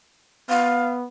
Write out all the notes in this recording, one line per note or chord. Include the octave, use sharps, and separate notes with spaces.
B3 F5